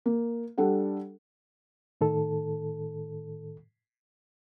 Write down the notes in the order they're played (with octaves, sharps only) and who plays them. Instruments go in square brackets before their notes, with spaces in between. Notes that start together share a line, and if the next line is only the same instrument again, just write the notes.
[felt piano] A#3
G3 D4 A4 F#5
[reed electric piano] A2 D#3 A4